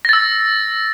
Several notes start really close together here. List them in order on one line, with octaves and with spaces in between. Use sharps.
A#6 A6 E6